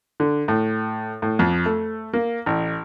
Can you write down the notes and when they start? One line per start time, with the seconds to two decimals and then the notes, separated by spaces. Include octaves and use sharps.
0.20 D3
0.48 A2
1.22 A2
1.39 F2
1.66 A3
2.14 A#3
2.46 A1